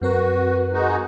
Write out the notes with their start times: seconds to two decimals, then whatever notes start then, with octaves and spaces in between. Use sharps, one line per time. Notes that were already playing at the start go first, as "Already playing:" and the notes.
0.02 F#2 C4 F#4 A#4 B4
0.73 G#3 D#4 F#4